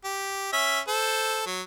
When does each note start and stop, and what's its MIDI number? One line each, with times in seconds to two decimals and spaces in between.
0.04 0.49 67
0.53 0.80 61
0.53 0.80 76
0.88 1.42 69
0.88 1.42 72
1.47 1.62 54